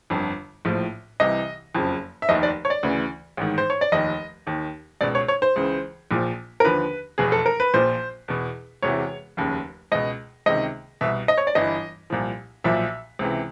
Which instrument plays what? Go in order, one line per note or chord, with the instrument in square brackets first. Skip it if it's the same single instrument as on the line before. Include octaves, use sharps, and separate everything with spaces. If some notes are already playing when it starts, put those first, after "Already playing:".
[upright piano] G1 F2 D3
A#1 A2 F3
C2 C3 E3 D#5
F#1 F2 C#3 F3
E5
F1 D#2 D#3 D#5
D5
C#5
D5
D2 C#3 E3
A1 G#2 D#3
C5
C#5
D5
F1 D#2 D#3 D#5
D#2 D#3
C#2 B2 D5
C#5
C#5
C5
C#2 C#3 E3
A#1 A#2 F3
A#4
D#2 D3 F3 B4
F1 E2 B2 G#4
A4
A#4
B4
A#1 A#2 F3 C5
E2 B2
E1 E2 C3 E3 C#5
F1 D#2 C#3
C#2 B2 D#5
C#2 C3 D#3 D#5
C2 B2 E5
D#5
C#5
D5
G1 G2 E3 D#5
C2 A#2 F3
B1 A#2 F3 E5
C#2 C3 E3